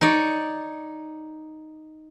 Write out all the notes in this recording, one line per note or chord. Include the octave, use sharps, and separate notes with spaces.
D#4 C#5 D5